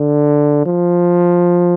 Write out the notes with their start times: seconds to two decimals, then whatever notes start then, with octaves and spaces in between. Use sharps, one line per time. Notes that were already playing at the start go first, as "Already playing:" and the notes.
Already playing: D3
0.66 F3